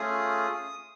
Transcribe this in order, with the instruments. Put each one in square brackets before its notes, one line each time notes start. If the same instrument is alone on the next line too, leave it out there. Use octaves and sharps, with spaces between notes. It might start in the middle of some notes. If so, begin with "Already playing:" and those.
Already playing: [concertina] A3 C#4 F4 G#4 D#6